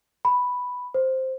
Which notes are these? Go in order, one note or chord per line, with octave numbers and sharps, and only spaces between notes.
B5
C5